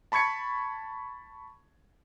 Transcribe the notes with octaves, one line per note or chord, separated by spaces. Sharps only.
A5 B5 C#6 G#6 C#7